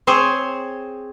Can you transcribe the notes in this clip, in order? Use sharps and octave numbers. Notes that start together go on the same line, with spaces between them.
C4 G#4 C5 C#5